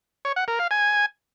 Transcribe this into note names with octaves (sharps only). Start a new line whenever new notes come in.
C#5
F#5
A#4
F5
G#5